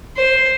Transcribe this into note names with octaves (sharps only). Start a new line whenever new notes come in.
C5